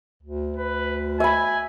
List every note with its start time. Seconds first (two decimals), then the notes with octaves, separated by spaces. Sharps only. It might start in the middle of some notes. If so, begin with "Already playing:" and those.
0.23 D2
0.57 B4
1.20 E5 G#5 B5